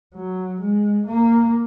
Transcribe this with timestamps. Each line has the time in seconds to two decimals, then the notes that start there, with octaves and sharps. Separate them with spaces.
0.14 F#3
0.61 G#3
1.07 A#3